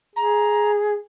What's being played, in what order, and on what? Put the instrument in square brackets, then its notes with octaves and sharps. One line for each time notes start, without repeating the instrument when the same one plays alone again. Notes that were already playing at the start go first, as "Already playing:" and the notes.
[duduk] G#4 [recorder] A#5